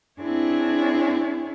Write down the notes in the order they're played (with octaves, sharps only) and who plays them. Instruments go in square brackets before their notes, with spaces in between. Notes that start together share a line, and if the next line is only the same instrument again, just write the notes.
[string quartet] C4 D4 E4 G#4 C#5